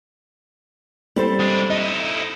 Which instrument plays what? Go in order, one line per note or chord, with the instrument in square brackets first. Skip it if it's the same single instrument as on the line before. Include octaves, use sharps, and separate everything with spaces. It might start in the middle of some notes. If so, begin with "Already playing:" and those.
[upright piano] G3 [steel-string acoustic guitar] C4 A4 C5
[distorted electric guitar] G#3 D4
[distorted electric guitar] D#4 E4 [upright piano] D#5